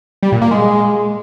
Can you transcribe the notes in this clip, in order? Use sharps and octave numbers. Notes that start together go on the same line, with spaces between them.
G3
A#2
A#3
G#3